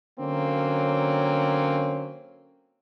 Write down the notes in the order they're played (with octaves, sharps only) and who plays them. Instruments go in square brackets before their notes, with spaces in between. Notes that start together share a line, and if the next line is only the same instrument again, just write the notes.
[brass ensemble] D3 F#3 A#3 C4 C#4